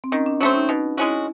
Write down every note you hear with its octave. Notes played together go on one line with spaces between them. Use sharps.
C4
D#3 C#4
D4
F#3 A3 C4 C#4
D#4
B2 D#4
G#3 C#4 E4 F#4